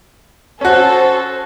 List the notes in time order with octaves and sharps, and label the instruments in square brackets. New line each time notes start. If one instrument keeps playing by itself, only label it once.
[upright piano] C#4 F#4 [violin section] A4 C5